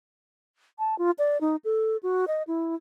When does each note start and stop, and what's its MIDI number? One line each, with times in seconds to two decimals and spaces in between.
0.79 0.97 81
0.99 1.11 65
1.19 1.40 74
1.41 1.56 63
1.65 1.97 69
2.03 2.25 66
2.28 2.43 75
2.47 2.75 64